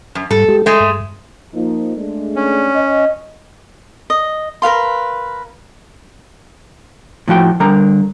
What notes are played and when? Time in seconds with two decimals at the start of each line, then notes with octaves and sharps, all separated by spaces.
0.15 F#2
0.31 G#2 G3 A4
0.48 G#3 G4
0.66 G#3 A3 A4
0.80 G2
1.54 F3 A#3 D#4
1.97 G#3 A3 D4
2.36 C#4
2.76 D#5
4.10 D#5
4.62 A#4 B4 F5 C6
7.28 A2 F3 F#4 G5
7.60 D3 G3 A#4 A#5